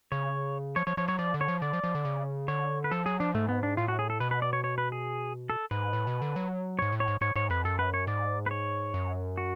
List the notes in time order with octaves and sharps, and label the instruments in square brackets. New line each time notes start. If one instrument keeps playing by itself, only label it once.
[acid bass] C#3 [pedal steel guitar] C#5
[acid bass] F3 [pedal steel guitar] C#5
[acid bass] F3 [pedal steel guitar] C#5
[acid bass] F3 [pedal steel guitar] C#5
[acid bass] F#3 [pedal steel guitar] C#5
[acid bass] F3 [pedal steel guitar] D5
[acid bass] D3
[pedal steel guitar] C#5
[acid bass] F3
[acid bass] D3 [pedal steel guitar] D5
[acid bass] F3
F3
D3
C#3
[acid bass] D3 [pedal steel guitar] C#5
[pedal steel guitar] B4
[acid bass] F3 [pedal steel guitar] A4
[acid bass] F#3 [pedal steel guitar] G#4
[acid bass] F3 [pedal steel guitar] D4
[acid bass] G#2 [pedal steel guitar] A3
[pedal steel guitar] B3
D4
[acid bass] A2 [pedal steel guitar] F4
[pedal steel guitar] F#4
G#4
A4
[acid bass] B2 [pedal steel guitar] B4
[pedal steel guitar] B4
D5
C#5
C#5
B4
G#4
A4
[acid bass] G#2 [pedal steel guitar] B4
[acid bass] A2
B2
D3
F#3
[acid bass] G#2 [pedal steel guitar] C#5
[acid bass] A2
[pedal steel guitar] C#5
[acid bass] G#2
[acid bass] G#2 [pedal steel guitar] C#5
[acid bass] G#2 [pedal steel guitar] C#5
[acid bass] F2 [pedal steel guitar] B4
[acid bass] F#2 [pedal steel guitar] A4
[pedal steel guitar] B4
C#5
[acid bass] G#2 [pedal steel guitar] D5
[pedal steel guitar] B4
C#5
[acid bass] F#2
[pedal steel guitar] F#4